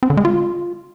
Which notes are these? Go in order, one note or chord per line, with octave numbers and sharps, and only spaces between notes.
C4
D3
G#3
F4